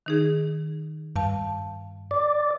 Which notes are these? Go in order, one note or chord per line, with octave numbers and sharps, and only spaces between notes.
D#3 D#4 G#4
G2 F5 A5
D5